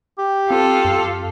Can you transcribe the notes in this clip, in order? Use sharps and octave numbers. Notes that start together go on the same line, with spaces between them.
G4
C4 F4 A4
F#2